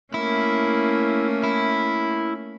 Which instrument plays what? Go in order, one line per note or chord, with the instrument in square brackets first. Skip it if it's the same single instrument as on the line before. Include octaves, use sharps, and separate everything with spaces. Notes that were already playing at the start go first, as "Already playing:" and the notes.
[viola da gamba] A3 A#3 C#4 [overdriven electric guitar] E4
[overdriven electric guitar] E4